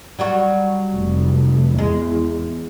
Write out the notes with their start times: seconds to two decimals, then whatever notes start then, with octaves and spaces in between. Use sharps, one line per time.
0.19 F#3 G3 F#4
0.93 F1
1.79 E2 G#3